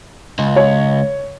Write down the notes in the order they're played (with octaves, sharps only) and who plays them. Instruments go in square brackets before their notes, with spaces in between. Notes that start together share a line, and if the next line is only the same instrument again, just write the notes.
[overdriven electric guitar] C#2
[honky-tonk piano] C#5